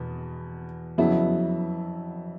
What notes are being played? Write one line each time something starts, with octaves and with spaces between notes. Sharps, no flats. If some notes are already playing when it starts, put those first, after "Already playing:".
Already playing: E2 B2
F2 C#3 F#3 B3 E4